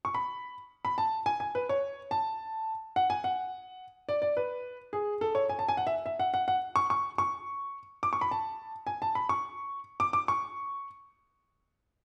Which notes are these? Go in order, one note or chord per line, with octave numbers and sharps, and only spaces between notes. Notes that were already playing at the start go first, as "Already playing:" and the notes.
C#6
B5
B5
A5
G#5
G#5
B4
C#5
A5
F#5
G#5
F#5
D5
D5
B4
G#4
A4
C#5
G#5
A5
G#5
F#5
E5
E5
F#5
F#5
F#5
C#6
C#6
C#6
D6
C#6
B5
A5
G#5
A5
B5
C#6
D6
D6
C#6